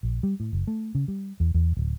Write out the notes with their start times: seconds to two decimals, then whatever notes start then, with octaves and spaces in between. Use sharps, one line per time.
0.03 A#1
0.23 G3
0.40 A2
0.53 F#1
0.67 A3
0.95 C#3
1.08 G3
1.40 E2
1.54 E2
1.77 D1